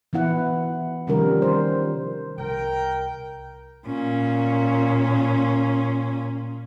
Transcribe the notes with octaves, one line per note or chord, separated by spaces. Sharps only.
E3 B3 E4 F#5
C3 D#3 F3 G3 C#4 A#4
C5
C2 A#4 G5
A#2 C#4